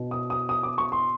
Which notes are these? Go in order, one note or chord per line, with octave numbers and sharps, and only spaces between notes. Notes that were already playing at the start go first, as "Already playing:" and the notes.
Already playing: B2
D#6
D#6
D#6
D6
C#6
C6